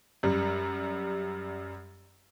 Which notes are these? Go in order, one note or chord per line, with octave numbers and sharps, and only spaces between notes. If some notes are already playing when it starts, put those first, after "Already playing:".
F#2 G3